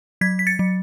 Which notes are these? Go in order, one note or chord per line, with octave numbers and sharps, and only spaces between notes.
F#3 G#6 B6
B6
A6 C#7
F#3